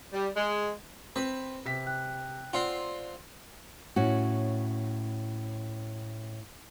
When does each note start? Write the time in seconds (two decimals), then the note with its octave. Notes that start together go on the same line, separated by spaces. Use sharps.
0.13 G3
0.36 G#3
1.16 C4 B4
1.65 C3 B6
1.86 G5 F#6
2.53 C4 F4 D5 F#5 C6
3.96 A2 C#4 F#4